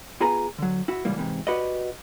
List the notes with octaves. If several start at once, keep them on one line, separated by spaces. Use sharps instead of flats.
B3 F4 G#4 B4 G#5 A#5
D3 F#3
E4 F#4
C#2 G#2 E3 G3 A#3
G#2 C3 E3
F#4 G4 B4 D5 D#5